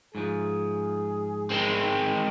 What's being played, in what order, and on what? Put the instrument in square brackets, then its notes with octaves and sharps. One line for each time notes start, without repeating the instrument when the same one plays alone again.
[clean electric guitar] G#2 F3 [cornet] G#4
[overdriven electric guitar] G#3 C4